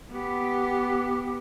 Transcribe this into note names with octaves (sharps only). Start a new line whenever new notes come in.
B3 G4